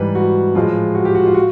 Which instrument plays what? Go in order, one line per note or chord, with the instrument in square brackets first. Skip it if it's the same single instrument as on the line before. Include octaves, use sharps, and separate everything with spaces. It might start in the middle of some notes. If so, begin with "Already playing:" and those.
Already playing: [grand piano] G#2 E3 G3 B4
F#4
A2 F3 G#3 F4
F#4
G4
F#4
F4
F#4